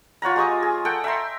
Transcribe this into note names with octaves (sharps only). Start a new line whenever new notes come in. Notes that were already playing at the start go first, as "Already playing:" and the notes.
F4 C#5 F#5 A#5
G#3 G4 C#6 D#6
G#4
A4 F#5 G5
E5 G5 A#5 C6